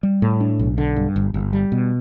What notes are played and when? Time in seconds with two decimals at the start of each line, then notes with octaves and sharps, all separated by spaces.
0.03 G3
0.22 A2
0.41 D4
0.59 B1
0.78 D3
0.96 G2
1.16 G1
1.34 G1
1.53 G3
1.72 B2